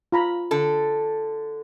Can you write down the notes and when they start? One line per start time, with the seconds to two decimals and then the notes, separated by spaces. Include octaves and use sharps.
0.12 F4 A#5 B5
0.51 D3 A4